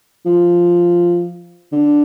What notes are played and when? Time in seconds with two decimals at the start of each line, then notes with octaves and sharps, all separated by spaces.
0.26 F3
1.73 D3